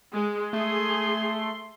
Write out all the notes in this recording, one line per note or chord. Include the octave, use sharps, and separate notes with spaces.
G#3
A3 G#4 C6